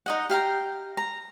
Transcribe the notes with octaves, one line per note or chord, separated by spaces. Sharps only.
D#4 D#5 F#5
G4 F5 G5 A#5
A#5